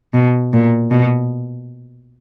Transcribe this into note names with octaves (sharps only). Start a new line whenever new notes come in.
B2
A#2
B2